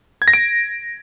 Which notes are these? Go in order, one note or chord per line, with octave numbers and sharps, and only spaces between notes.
G#6
A#6
D7